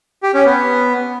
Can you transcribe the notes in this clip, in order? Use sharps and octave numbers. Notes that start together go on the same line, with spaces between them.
G4
C#4
B3